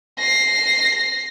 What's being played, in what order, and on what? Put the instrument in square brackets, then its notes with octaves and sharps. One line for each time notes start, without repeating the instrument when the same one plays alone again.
[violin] A#6 C7